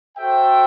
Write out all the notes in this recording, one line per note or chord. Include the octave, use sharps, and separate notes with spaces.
F#4 A4 C5 E5 G5